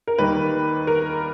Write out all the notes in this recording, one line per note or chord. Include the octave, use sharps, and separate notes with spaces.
A#4
D#2 D#3 G3 A#3 B4
A#4